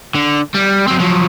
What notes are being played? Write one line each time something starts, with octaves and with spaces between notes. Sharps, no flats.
D3
G3
F#3 C4
F3 F#3